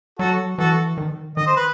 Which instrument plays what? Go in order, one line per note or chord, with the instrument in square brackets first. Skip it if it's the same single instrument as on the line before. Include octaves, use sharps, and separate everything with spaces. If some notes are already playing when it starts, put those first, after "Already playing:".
[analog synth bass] F#3 [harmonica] F#4 A4
[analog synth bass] E3 [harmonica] F#4 A4
[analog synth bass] D#3
[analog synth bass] D#3 [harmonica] D#5
[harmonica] C5
B4